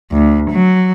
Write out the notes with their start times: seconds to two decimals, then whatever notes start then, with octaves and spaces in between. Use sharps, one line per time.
0.12 D2
0.51 F#3